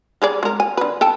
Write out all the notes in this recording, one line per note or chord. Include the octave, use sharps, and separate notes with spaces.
G3 G#4 D5
G#3 A#4
G#5
D3 B4
A4 G5 A5